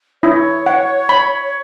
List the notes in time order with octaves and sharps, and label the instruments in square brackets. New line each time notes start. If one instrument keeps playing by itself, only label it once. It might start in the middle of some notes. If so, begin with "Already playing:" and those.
[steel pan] E4 [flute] C#5
[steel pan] F#5
B5